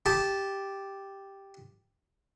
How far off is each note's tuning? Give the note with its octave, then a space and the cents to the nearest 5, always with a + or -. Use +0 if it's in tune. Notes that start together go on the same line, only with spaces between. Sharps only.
G4 +0 A5 -10